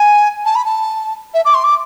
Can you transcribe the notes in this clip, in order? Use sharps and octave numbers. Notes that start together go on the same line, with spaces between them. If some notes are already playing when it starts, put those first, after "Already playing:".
Already playing: G#5
A5
B5
A5
E5
D6
C6
D6